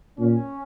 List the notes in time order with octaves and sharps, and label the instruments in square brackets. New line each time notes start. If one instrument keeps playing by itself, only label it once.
[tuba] A#2 [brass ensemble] C#4